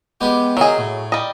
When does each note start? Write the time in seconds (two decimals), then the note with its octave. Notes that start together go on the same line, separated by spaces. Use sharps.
0.21 G#3 B3 G4
0.57 F#3 D#4 G#4 A#4
0.78 A2
1.12 G3 D#5